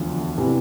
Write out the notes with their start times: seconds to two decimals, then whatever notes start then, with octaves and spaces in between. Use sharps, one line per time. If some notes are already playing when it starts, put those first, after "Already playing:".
Already playing: E1 D2 D3 F3
0.38 C3 E3